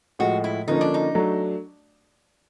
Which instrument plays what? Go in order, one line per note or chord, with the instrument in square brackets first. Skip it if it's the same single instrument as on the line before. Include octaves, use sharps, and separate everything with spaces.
[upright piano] A2 F3 G#3 [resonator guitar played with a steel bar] F#4
[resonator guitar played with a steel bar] E4
[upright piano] D3 F3 A#3 C#4 [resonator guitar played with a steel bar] D#4
[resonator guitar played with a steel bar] D4
D#4
[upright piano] F#3 A3 D4